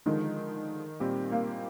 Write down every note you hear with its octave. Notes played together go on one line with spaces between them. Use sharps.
D3 D#3 F3 G#3
A#2 G3 C4 G4
A#3